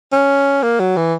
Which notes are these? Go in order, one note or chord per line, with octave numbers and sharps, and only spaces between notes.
C#4
A#3
F#3
E3